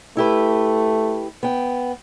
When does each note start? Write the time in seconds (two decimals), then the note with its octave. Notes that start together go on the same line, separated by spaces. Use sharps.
0.17 A3 E4 G4 B4
1.43 B3 G5